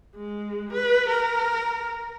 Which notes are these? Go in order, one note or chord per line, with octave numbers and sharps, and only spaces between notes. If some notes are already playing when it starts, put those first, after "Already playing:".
G#3
B4
A#4